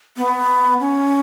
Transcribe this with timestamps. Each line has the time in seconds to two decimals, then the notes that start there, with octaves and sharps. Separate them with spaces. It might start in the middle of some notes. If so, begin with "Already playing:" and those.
0.17 B3
0.80 C#4